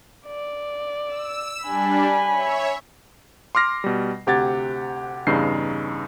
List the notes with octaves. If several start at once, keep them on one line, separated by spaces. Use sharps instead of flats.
D5
E6
G3 D4 G#5 B5
C#5 E5
C6 D6 F6 A#6 C7
B2 G3
D2 C3 G4 F#5 G#6 A6
E2 G2 C#3 D#4 C7